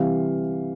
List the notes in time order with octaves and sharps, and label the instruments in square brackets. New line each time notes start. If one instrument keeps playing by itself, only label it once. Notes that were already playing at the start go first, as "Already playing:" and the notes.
Already playing: [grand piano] C3 E3 G3 F5